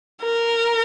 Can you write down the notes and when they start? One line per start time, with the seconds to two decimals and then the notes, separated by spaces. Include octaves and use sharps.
0.23 A#4